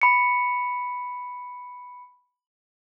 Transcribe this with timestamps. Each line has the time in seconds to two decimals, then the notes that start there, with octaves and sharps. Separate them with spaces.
0.02 B5 C#7